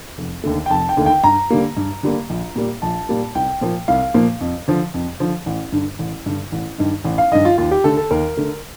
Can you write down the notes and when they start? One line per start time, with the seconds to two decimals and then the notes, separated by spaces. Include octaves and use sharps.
0.18 F1
0.44 D#2 D3 A3
0.66 G5
0.70 F1 A5
0.89 G5
0.97 D#2 D3 A3
1.06 G5
1.24 G2 A#5
1.50 D3 G3 A#3
1.77 G2
2.03 D3 G3 A#3
2.30 A#1
2.56 A#2 G3 A#3
2.82 A#1 A5
3.09 A#2 G3 A#3
3.35 C2 G5
3.61 A#2 F3 A#3
3.88 C2 F5
4.14 A#2 F3 A#3
4.41 F2
4.68 D3 F3
4.94 F2
5.20 D3 F3
5.46 A1
5.72 G2 D3
5.99 A1
6.26 G2 D3
6.52 A1
6.78 G2 D#3
7.05 A1
7.18 F5
7.32 G2 D#3 D#5
7.45 F4
7.58 D#2 F4
7.71 G4
7.84 D3 A3 A4
7.97 A4
8.11 D#2 A#4
8.37 D3 A3